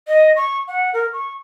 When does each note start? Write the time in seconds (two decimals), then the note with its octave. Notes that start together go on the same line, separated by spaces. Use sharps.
0.08 D#5
0.36 C#6
0.68 F#5
0.94 A#4
1.13 C#6